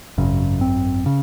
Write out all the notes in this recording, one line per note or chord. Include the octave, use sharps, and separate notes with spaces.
G#1 F#2 C#3
C4
C#3